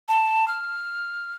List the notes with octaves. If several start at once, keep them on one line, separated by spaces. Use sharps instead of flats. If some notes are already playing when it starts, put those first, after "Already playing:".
A5
F6